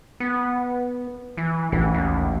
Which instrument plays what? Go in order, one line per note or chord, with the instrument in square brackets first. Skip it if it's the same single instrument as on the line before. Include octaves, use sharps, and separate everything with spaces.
[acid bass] B3
E3
[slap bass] A1 F#2 [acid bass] E3
[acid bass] D#2